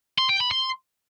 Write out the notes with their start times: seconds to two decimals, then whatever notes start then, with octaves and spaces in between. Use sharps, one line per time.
0.18 C6
0.29 G5
0.40 B5
0.51 C6